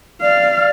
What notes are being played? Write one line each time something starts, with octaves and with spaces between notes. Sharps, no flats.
D5 F5